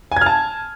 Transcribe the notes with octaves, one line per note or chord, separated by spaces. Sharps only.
G#5 A5 F6 G#6